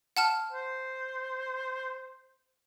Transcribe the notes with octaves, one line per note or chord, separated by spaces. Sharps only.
F#5 A5 F6
C5